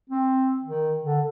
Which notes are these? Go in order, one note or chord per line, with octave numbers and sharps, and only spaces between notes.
C4
D#3
D3